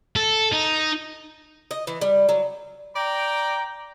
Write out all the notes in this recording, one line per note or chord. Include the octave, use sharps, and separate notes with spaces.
A4
D#4
D#5
E3
G3
F#3
D5 G5 A#5